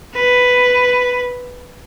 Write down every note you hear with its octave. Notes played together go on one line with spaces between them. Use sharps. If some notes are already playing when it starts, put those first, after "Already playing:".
B4